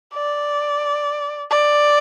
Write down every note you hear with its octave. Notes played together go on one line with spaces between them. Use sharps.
D5
D5